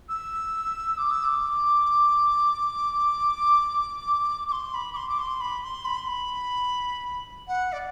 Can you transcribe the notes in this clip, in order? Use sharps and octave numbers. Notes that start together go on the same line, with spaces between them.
E6
D6
E6
D6
D6
C6
B5
D6
C6
D6
C6
B5
C6
B5
C6
B5
F#5
D5